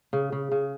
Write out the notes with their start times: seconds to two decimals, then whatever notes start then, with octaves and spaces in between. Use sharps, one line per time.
0.13 C#3
0.32 C#3
0.52 C#3